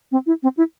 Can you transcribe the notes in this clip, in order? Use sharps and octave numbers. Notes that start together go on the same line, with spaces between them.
C4
E4
C4
E4